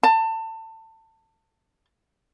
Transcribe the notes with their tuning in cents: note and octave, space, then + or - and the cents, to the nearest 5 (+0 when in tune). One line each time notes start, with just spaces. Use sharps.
A5 +25